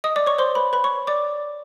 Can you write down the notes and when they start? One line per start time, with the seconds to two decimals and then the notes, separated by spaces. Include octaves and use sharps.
0.04 D#5 D#6
0.16 D5 D6
0.27 C#5 C#6
0.38 C5 C6
0.55 B4 B5
0.73 B4 B5
0.84 C#5 C#6
1.07 D5 D6